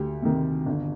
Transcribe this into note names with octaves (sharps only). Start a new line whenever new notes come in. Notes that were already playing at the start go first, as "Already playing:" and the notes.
Already playing: D2 G4
C3 D#3
G1